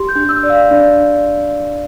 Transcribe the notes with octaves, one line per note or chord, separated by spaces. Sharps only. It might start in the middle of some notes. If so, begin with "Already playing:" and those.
Already playing: G4 C6
G6
D4
E6
D5
F5
D4 D5